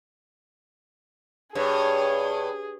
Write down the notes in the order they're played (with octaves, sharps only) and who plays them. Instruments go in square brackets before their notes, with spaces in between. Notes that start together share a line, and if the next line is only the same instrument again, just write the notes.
[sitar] G2 [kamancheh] G#4 [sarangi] C#5